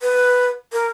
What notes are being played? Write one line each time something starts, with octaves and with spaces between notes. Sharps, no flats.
B4
A#4